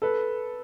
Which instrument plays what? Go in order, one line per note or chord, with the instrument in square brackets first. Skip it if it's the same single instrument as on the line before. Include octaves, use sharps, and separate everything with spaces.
[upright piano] A4 B4